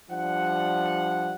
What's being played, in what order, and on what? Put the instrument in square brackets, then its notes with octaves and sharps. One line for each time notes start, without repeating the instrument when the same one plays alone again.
[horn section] F3 G3 D4 F#5